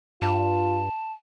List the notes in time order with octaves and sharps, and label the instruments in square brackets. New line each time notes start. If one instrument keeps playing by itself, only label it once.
[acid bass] G2 [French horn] F4 [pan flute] A5